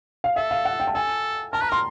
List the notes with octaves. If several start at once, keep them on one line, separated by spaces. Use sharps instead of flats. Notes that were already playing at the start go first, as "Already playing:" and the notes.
F5
A4 E5
F5
F#5
G5
A5
A4 G#5
A#4 A5
B4 A#5
A#4 C6